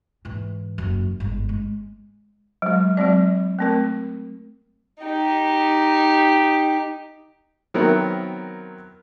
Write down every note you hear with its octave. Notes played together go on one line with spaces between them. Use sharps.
G#2 E3
F#1 F#2
G1 G#2
G#3
F#3 G#3
F#3 G#3 C4 D5
A3 C4 A#4
D#4 G4
D#3 F#3 B3 C4 E4 A#4